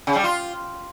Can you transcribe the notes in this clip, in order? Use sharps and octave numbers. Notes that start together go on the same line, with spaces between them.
C#3
G3
F4